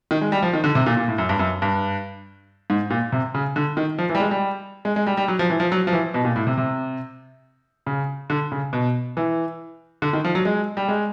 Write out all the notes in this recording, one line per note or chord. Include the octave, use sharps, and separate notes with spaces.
D#3
G#3
G3
F3
D#3
D3
C3
A#2
A#2
A2
F#2
G2
F#2
G2
G#2
A#2
C3
C#3
D3
D#3
F3
E3
G3
G#3
G3
G#3
G#3
G3
G3
F#3
F3
E3
F3
F#3
F3
E3
B2
A#2
A2
C3
C3
C#3
D3
C#3
B2
E3
D3
D#3
F3
F#3
G#3
G3
G#3